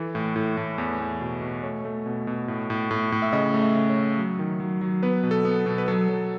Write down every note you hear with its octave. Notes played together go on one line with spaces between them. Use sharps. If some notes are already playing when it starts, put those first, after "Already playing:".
Already playing: E3 A4
A2
A2
A2
E2
E2
B2
B2
A3 C#5
A3
B2
B2
A2
A2
A2
A2
E5
C#3 D#5
A3
E5
C#3
C#5
C#3
F#3
D#3
F#3
F#3
B3 B4
B2
A4
B3
B2
B4
F#3 A4
F#3